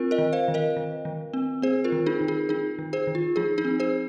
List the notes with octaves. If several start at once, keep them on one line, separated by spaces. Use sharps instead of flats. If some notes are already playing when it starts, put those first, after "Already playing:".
Already playing: C4 F4 A#4
A#4 D#5
D#3
C5 F5
D#3
A#4 D#5
D#3
D#3
C4
C4 G#4 C5
F4 A#4
D#3
D#4 G#4
D#3
D#4 G#4
D#3 D#4 G#4
D#3
G#4 C5
D#3
F4
F3 D#4 G#4
D#4 G#4
C4
G#4 C5